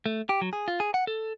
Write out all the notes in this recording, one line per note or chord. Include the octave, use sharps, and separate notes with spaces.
A3
G4
F#3
G#4
F4
G#4
F#5
A4